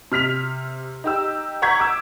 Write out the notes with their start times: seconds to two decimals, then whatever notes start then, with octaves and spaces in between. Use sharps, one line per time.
0.12 C3 F6 B6 F7
1.04 D#4 G4 E6
1.62 F#5 A#5 C#6 G6 G#6 B6
1.80 D6 E6